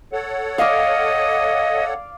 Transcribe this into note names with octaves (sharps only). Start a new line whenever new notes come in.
A4 C#5 F#5
D5 D#5 F5